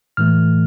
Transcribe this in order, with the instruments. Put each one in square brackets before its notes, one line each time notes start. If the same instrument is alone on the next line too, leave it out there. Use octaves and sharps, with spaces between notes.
[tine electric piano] A2 E3 A3 F6